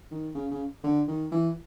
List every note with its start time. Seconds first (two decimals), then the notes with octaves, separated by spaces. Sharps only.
0.11 D#3
0.35 C#3
0.51 C#3
0.84 D3
1.08 D#3
1.32 E3